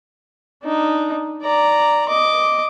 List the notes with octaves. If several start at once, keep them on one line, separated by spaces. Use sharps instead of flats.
D4 D#4
D5 A#5
D#5 D6